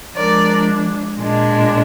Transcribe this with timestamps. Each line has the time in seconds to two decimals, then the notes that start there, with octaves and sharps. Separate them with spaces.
0.16 F3 G#3 D4 A#4 D5
1.19 A#2 G#3 D4